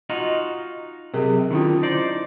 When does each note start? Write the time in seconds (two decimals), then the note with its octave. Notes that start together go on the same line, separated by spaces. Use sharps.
0.09 D#4 F4 F#4 D#5
1.14 C3 F#3 G#4 A#4
1.51 D3 D#3 C#4 E4 F4
1.83 D#4 C5 D5